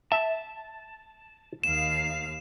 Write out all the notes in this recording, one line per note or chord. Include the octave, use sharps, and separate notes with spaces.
E5 A5
D#2 F5 E7